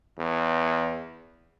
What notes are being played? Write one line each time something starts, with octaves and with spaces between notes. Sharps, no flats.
E2